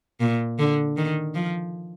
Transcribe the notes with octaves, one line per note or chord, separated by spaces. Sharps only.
A#2
D3
D#3
F3